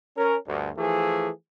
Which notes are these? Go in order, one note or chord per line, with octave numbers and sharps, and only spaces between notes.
C#4 A#4
D2 G2
E3 F3 A3 G#4